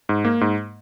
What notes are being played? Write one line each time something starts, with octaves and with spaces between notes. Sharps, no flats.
G#2
A#3
G#2